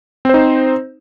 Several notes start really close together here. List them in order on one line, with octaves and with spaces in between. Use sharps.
C4 C5 D#4